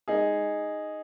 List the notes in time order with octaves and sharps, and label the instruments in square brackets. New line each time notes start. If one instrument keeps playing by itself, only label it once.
[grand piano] G#3 D#4 G#4